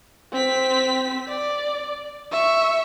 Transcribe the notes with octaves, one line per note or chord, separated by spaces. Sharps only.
C4 B6
D5
E5 C#6